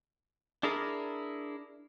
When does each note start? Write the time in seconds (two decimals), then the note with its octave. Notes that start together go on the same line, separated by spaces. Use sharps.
0.63 D4 E4 G#4 A#4